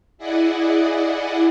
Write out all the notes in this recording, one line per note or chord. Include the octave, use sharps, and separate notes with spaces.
E4 G#4 D5 D#5 F#5